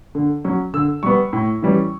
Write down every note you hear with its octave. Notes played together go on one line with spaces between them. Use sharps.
D3
F#3 C#4
D3 E6
G3 B3 C#6
A2
E3 G3 C#4